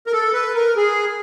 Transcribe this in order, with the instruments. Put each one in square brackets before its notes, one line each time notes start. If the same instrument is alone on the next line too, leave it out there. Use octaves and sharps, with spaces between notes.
[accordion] A#4
A4
B4
A#4
G#4